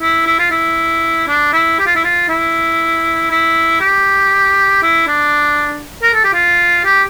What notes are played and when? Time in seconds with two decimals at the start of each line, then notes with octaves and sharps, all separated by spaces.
0.01 E4
0.27 E4
0.39 F4
0.51 E4
1.28 D4
1.53 E4
1.79 G4
1.87 F4
1.96 E4
2.04 F4
2.29 E4
3.31 E4
3.81 G4
4.83 E4
5.07 D4
6.03 A#4
6.14 A4
6.24 G4
6.33 F4
6.85 G4